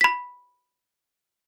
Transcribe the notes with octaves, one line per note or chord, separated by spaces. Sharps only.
B5 B6